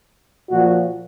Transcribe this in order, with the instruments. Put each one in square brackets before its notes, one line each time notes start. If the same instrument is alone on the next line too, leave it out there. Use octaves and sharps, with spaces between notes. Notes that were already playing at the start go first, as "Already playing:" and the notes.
[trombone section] A#2 F3 F#4